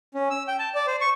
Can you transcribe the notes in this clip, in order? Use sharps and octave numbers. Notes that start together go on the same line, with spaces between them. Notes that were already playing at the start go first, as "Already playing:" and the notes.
C#4
E6
G5
A5
D5
C5
C#6